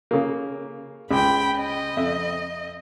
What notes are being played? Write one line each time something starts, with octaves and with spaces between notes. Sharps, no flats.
C#3 A#3
C#2 G5 B5
D#5
F2 E5